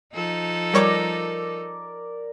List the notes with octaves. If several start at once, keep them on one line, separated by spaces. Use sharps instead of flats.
F3 D#4 A4
G3 A#4 C#5 D5 D6